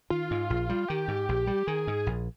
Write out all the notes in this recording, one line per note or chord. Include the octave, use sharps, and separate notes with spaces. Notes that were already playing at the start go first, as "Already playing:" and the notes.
D#3 F4
G#2
A#1
G3
D#3 G4
G#2
A#1
G3
D#3 G#4
G#2
A#1